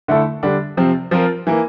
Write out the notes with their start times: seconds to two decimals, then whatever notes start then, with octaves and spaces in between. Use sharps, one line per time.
0.08 D3 A3 E4 A4
0.43 D3 G3 D4
0.77 C3 F3 C4
1.11 F3 C4 F4 A#4
1.47 E3 A#3